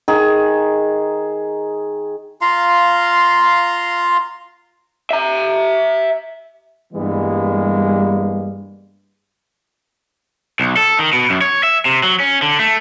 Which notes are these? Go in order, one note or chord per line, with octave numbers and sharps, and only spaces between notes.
D#3 G#4
F4 F5 A#5 C6
E5 A#5
G2 E3 G3 G#3 A#3 B3
B1
A4
D#3
B2
F#2
C#5
E5
C3
F#3
C#4
D3
A3